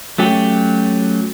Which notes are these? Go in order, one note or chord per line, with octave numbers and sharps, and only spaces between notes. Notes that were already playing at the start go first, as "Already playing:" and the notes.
F#3 A3 C#4 G4